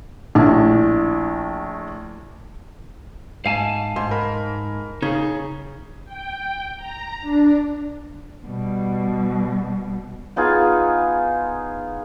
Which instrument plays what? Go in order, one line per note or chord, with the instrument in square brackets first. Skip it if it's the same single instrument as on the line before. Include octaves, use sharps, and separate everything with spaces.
[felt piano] A#1 A2 A5
[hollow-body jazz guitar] G#2 [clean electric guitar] F5 G#5 A5
[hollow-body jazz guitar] G#2 [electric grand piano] C6
[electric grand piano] A#4 B5
[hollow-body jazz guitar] C#3 [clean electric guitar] D#4 [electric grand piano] G#4 G#6
[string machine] G5
A#5
D4
[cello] B2 G3
[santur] B3 D#4 F4 G#4